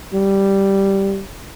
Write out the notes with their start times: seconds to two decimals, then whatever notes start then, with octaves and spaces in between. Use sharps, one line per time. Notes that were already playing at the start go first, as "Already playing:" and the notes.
0.14 G3